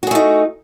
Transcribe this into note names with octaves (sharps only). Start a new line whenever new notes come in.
A3 D#4 F#4 G#4